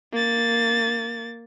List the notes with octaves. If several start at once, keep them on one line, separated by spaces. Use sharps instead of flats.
A#3 A6